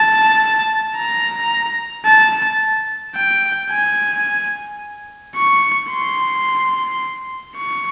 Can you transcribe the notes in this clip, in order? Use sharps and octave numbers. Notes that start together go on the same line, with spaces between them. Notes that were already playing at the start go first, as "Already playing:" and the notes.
Already playing: A5
A#5
A5
G5
G#5
C#6
C6
C#6